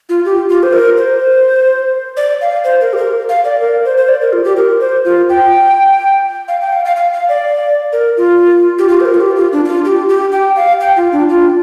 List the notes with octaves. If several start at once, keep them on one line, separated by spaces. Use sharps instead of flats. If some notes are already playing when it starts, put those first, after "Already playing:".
F4
G4
F4
C5
A#4
C5
D5
F5
C5
A#4
G4
A#4
F5
D5
A#4
C5
C5
D5
A#4
F4
G4
A#4
C5
F4
G5
F5
G5
F5
F5
F5
F5
D5
A#4
F4
G4
F4
C5
A#4
F4
G4
F4
D4
D4
F4
G4
G4
G5
F5
G5
F4
D4
F4